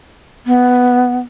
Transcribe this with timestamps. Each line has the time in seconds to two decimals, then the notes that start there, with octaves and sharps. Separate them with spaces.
0.47 B3